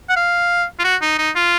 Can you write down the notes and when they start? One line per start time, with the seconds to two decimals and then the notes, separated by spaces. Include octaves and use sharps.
0.10 F#5
0.16 F5
0.79 F4
0.84 F#4
1.02 D#4
1.18 D#4
1.36 F4